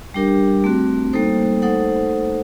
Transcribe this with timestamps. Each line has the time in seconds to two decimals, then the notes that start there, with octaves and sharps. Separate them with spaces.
0.14 G3 D4 G4 A#4
0.64 A3 C4 F#4
1.13 G3 A#3 D#4 A4 C5
1.62 A3 D#4 A4 C5 F#5